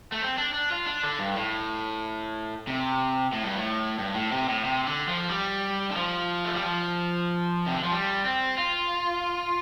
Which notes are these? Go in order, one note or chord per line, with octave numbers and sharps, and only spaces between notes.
A3
C4
D4
D4
F4
D4
D3
G2
A2
C3
A2
G2
A2
G2
A2
C3
A2
C3
D3
F3
G3
D3
F3
A3
G3
F3
C3
D3
F3
G3
C4
F4